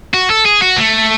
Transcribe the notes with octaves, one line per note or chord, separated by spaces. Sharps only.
F#4
A4
G#4
F#4
A3